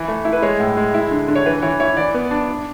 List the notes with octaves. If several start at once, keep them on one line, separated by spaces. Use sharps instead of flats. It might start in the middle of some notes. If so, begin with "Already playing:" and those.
Already playing: E3
A3
E4
B4
G#3 C#5
A2
G#3
E4
D3
D3
C#5
E3 B4
E3 C#5
E4 C#5
E3 D5
B3
D4
D4